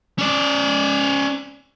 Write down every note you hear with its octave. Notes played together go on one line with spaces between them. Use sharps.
C#4 D5